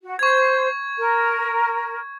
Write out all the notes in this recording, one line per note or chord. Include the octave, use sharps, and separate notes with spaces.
F#4
C5 C#6 G#6
A#4